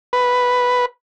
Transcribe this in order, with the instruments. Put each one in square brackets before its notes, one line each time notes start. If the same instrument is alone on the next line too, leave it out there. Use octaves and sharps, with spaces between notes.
[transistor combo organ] B4